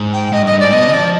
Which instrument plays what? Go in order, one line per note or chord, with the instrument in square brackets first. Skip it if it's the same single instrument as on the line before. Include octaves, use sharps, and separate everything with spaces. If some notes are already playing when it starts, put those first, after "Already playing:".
Already playing: [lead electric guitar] G#2
[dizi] G5
[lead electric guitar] G#2 [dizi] D#5
[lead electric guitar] G2
[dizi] D#5
[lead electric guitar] G2
[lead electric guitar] G#2 [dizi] D5
[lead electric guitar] B2 [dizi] D#5
[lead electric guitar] F3 [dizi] D5